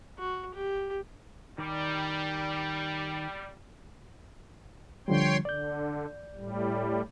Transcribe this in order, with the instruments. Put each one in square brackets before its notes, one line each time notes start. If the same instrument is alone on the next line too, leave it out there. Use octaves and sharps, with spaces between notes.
[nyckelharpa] F#4
G4
[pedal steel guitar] D#3 D5 [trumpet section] G3
[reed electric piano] D3 F3 G3 [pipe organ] C#5 G5 C6
[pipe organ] D3 [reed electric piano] D5 G6
[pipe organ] A2 G3